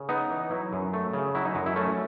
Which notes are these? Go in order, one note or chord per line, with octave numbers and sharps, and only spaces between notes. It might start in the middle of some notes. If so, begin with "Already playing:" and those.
Already playing: C#3
B3 D#4
E3
F#3 E4
F#2
A3
C#3
F#3 E4
D#4
F#2 F#4
E4
A3 C#4